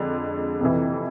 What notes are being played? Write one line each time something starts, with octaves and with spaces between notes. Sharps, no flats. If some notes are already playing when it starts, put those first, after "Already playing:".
Already playing: F2 D3 G#3
F2 C3 E3